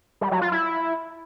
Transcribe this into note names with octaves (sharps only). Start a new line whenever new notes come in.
G3
F#3
F4
E4